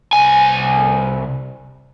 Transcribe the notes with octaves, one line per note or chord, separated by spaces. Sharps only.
C2 G#5